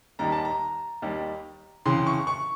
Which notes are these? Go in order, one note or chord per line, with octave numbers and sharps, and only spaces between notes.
D#2 D#3 G3 A#5
A5
A#5
D#2 D#3 G3
F2 C#3 E3 C6
C#6
C#6